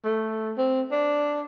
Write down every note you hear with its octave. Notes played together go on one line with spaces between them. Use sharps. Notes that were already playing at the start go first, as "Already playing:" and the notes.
A3
C4
D4